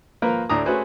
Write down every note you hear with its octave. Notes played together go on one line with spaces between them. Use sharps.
F3 A#3 A#4 B4
D2 A2 D4 A#5 D#6
A3 C#4 F#4 G#4 B4 C5